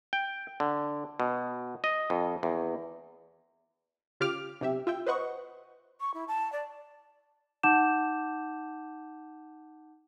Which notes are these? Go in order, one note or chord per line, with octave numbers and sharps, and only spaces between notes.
G5
D3
B2
D#5
F2
E2
C#3 F4 G4 D6 F6
B1 C3 G4 E5
F4 E5 G5
B4 C5 D#5 F#5 C#6
C#6
E4
A5
D5
D#4 F#5 A5 D6 G6 E7